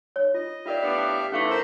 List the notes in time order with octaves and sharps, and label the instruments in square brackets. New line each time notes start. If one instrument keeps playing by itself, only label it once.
[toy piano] C#5
[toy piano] F4 [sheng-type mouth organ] D#5
[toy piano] F4 A#4 D5 [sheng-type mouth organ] G4 E5 F5
[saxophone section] A2 B3 D4
[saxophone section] D3 E3 A3 [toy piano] C#4 F5 D6
[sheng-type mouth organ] A#4 C5 E5